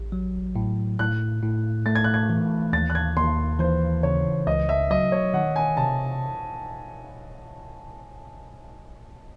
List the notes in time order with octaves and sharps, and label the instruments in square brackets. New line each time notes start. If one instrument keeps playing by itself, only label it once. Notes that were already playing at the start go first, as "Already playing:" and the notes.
Already playing: [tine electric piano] A1
F#3
A2
[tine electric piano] A2 [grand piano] F#6
[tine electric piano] A2
[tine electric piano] A3 [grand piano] A6
[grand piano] G#6
F#6
G#6
[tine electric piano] E3
[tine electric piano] D#2 [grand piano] A6
[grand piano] F#6
G#6
[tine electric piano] D#2 [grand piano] C6
[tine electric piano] E3 [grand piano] C5
[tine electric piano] C#3 [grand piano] C#5
[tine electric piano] C#2 [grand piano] D#5
[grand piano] E5
[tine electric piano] F#3 [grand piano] D#5
[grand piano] C#5
[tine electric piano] D#3 [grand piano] F#5
[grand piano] G#5
[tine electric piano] C3 [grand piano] A5